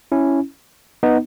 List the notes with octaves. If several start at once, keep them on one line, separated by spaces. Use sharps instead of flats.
C#4 E4
B3 D#4